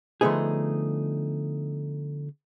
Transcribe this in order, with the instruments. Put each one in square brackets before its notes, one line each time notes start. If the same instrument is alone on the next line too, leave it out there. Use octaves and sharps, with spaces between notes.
[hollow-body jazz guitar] D3 F3 A3 B3 D#4 G#4